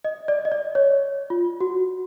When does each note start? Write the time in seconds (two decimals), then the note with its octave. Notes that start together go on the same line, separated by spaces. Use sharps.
0.04 D#5
0.28 D5
0.45 D#5
0.52 D5
0.75 C#5
1.30 F4
1.61 F#4